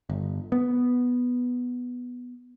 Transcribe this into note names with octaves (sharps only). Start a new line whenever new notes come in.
G1
B3